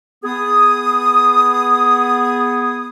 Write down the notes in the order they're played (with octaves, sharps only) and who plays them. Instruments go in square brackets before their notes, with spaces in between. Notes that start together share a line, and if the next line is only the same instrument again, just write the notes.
[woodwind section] B3 G#4 D#6